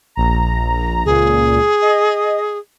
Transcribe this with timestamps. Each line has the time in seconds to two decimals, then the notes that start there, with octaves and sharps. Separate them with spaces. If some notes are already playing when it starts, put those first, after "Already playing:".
0.15 A#1 A#5
1.06 C#2 A#2 G#4
1.82 D#5